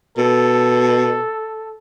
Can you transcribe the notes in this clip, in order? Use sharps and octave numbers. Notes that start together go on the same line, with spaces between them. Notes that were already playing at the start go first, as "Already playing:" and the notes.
B2 A4